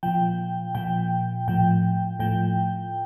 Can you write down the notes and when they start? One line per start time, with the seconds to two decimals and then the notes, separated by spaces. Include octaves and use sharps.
0.03 A#2 F3 G5
0.75 A#2 F3 G5
1.48 A2 F3 G5
2.19 A2 F3 G5